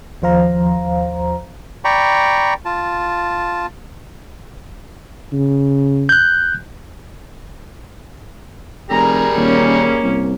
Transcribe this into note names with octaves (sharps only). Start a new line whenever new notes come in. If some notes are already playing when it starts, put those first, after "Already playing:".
D#2 F3 C5 F5 A#5
D5 G5 A#5 B5 C#6
F4 A5
C#3
F#6 G6
F1 G3 G#4 A#4 A#5
D#1 A#3 C#4
C2